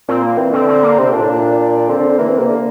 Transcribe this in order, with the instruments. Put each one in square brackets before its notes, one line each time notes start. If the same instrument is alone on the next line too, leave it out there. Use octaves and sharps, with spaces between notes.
[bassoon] A#2 [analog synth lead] C4
[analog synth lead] A#3
[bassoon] E3 [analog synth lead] C4
[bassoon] D3 [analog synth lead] C4
[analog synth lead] C4
A#3
[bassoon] C3 [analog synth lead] C4
[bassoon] A#2 [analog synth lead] D4
[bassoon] A2
A#2
[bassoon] D3 [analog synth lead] C4
[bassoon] D3
D3
[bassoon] E3 [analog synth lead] A#3
[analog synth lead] C4
[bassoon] C3 [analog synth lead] A#3
[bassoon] D3